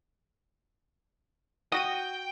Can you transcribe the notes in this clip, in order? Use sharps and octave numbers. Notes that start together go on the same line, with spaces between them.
F#4 G5 D#6 A#6 D#7